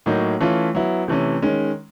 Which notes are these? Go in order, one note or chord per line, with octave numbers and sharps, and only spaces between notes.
A2 F#3 A#3 D#4
E3 A3 C#4 F4
F#3 B3 E4
C3 E3 A3 C#4
D#3 G#3 C#4